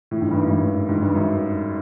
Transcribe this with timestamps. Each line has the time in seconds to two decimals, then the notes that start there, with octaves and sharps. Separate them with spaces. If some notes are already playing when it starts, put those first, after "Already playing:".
0.11 A2
0.22 G#2
0.31 G2
0.41 F#2
0.51 G2
0.89 G#2
1.02 G2
1.15 F#2